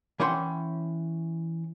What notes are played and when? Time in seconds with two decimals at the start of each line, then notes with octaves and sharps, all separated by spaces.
0.20 E3 C#4 F#5 G5 C6